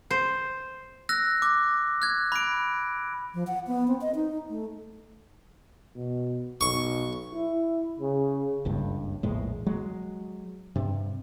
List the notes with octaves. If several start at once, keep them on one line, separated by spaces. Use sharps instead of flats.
C5
E6 F#6 A#6
D6
F#6 G#6
B5 D7
F3
F#5
B3
C4
D#5
D#4
A3
B2
B1 C#6
E4
C#3
F#1 C#2 G2
A#1 E2 A2 G#3
F#3 G#3
G2 C3